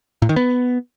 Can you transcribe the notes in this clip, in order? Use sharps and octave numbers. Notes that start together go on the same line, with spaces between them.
A2
D#3
B3